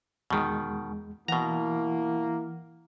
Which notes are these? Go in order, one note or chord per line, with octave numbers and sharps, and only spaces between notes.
E2 B2 D#3 G#3
B2 E3 A#3 E4 F#5 A#5